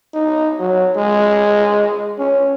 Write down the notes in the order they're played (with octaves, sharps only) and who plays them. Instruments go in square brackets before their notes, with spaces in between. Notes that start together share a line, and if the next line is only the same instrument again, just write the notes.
[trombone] D#4
F#3
G#3
C#4